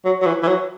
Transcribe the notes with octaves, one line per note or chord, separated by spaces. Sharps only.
F#3
F#3
E3
E3
F#3